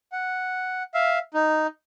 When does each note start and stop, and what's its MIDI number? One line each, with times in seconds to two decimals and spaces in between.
0.12 0.83 78
0.94 1.19 76
0.94 1.19 77
1.34 1.67 63